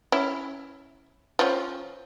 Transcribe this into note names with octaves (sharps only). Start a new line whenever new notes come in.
C#4 E4
F3 C#4